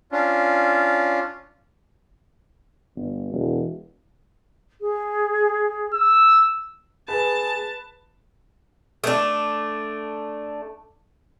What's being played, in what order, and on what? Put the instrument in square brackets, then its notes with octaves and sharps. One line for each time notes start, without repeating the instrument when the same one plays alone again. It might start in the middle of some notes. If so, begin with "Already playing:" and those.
[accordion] C#4 D4 F4
[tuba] G1
E1
[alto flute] G#4
[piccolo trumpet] E6
[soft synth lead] G#4 [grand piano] B4 [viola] A5
[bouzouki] A3 D4